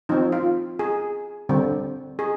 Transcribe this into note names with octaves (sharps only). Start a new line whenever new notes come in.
F3 C4 D#4
F4
G#4
D3 G3 C4
G#4